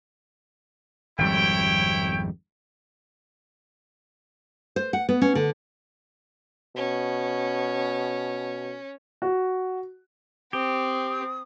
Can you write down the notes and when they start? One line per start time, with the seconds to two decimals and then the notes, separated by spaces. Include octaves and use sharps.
1.18 G#1 F2 G3 E4 C#5 G5
4.76 C5
4.93 F#5
5.09 B3
5.22 C#4
5.35 D3
6.76 B2 C#4
9.22 F#4
10.53 C4 G4 D#6